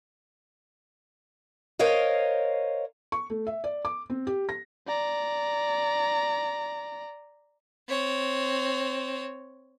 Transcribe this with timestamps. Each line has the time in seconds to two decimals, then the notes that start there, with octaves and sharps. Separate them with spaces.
1.79 A#4 C5 C#5 D#5 F5
3.12 C#6
3.30 A3
3.47 E5
3.64 D5
3.85 D6
4.10 C4
4.27 G4
4.49 A#6
4.87 D5 A#5
7.88 C4 C#5